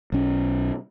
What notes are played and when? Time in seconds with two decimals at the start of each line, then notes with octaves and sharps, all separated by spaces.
0.12 B1 C#4